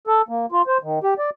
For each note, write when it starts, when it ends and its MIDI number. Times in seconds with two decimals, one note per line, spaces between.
0.07 0.22 69
0.29 0.46 58
0.52 0.62 65
0.67 0.78 72
0.83 0.99 51
1.04 1.14 67
1.18 1.30 74